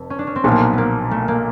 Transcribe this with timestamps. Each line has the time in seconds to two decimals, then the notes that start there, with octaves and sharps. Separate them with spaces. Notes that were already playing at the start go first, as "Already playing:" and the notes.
Already playing: F1 F2
0.10 C#4
0.19 D4
0.27 C#4
0.36 C4
0.44 B1 A#2 F3 B3
0.51 A#3
0.60 B3
0.73 A#3 B3
1.11 A3
1.28 A#3